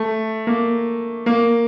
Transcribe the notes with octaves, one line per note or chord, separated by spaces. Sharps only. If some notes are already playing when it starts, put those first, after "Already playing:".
Already playing: A3
A#3
A#3